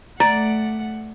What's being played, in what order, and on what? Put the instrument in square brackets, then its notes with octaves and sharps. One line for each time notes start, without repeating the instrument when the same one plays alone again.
[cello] A3 F#5 [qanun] D5 [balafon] A#5